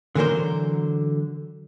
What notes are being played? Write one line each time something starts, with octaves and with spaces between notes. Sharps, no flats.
D3 E3 F#3 B3 A#4 C5